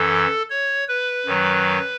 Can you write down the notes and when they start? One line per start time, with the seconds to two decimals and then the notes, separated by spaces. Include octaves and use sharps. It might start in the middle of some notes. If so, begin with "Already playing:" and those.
Already playing: F#2 E3 A4
0.50 C#5
0.88 B4
1.26 F#2 D#3 F#3